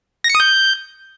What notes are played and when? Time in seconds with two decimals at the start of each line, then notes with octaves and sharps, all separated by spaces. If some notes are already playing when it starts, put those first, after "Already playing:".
0.24 A#6
0.30 C#7
0.35 D#6
0.40 G6